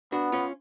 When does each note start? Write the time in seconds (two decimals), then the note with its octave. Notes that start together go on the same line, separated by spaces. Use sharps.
0.12 B3 D4 F#4
0.32 C#4 F4